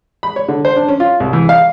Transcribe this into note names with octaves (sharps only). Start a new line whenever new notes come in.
B5
C#5
D3
C5
D4
C#4
F4
C2
E3
F5